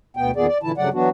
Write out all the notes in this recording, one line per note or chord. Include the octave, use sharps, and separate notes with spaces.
D2 B2 B3 G5
E2 A#2 D#3 B3 G#4 D5
D5
A#2 D3 E3 E4 A5
G2 C#3 F#3 A3 D5 F#5
E3 F#3 B3 D4 F#4